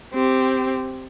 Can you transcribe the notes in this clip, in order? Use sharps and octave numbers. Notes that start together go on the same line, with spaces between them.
C4 G4